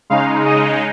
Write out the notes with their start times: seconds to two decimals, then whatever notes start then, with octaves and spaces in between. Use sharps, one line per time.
0.10 C#3 G#3 D#4 F5
0.45 D#5